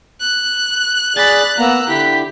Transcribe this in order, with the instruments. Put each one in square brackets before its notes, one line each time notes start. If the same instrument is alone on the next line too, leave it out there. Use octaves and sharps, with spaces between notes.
[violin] F#6
[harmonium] G#4 D5 [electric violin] B5 A6
[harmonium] A#3 B3 [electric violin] A#5 E6
[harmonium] D3 E4 [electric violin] G4 B6